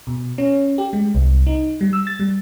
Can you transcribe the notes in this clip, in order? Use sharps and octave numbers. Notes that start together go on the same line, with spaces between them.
B2
C#4
G4
G#3
C2
D#4
G3
E6
A6
G3